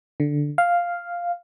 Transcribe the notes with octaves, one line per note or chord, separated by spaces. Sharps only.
D3
F5